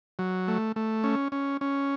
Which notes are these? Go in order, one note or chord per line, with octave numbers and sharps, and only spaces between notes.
F#3
A3
A3
C#4
C#4
C#4